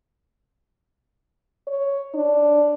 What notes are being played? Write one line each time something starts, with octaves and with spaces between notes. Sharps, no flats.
C#5
D4